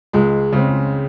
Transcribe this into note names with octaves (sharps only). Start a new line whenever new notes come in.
C#2 G#3 G#4
C#3 G#3 C4